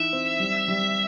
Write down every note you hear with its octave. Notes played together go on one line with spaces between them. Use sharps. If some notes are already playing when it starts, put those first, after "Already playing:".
Already playing: E3 D#4 E5
C4
G3
G3